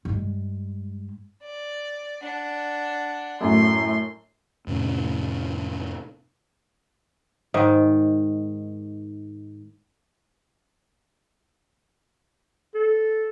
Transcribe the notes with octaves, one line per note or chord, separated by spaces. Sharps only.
G2 G#3
D5
D4 F#5
F#2 A2 C6
F2 A2 C3 C#4
G#2 D#3
A4